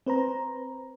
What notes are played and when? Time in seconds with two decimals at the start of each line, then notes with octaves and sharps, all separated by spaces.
0.06 C4 B4 C5 A#5